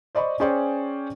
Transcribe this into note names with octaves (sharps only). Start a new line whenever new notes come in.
C5 D5 D#5 B5 C#6
C#4 G#4 C5 D5 G5 C#6